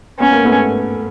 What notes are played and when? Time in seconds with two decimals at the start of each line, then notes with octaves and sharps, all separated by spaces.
0.19 B3 C#4
0.32 A#3
0.45 A3 B3